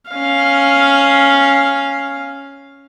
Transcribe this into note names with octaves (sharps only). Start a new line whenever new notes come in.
C#4 F5